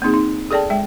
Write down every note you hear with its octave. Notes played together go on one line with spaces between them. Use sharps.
A#3 C4 D#4 G#4
D#4
G#4 A4 D5 G5 A5
G#3 E5 G5